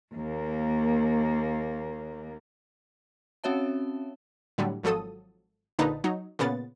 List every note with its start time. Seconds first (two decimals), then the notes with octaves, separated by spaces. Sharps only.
0.14 D#2 A#3
3.44 C4 C#4 F#4 C#5 E5 A5
4.58 A2 D3 F#3 G3
4.83 G#1 F3 F#3 A4 D#6
5.79 A#1 D3 A#3 D#4 B4 A5
6.04 F#3 D#4
6.39 A#2 C#3 B3 A6